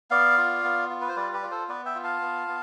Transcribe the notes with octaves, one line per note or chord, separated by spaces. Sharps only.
B3 D5 F5
F4
B3
F4
B4
C5
G3 B4 D5
G4 B4
F4 D5
A4 C5
B3 B4 D5
E5 G5
F4
F5 A5
B3
B3